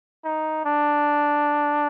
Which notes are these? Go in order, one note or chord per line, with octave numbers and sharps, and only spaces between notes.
D#4
D4